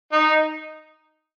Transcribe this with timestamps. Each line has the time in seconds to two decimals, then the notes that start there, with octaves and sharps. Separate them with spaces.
0.12 D#4